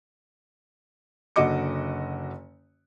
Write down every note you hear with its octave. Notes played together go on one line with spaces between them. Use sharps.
F#1 D3 F#4 D#5 D6 C#7